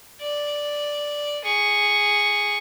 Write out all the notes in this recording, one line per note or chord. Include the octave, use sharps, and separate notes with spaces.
D5
G#4 C#6